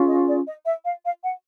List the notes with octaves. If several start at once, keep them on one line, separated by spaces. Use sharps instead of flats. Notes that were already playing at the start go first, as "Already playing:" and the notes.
Already playing: C#4 F4 G#4
D#5
D5
D#5
E5
F5
F5
F#5